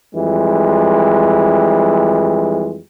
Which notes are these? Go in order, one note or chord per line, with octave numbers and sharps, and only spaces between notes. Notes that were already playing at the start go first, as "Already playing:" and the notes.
F2 E3 G3 G#3